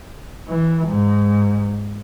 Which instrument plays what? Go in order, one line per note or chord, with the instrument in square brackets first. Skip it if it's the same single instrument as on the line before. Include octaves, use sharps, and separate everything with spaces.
[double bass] E3
G#2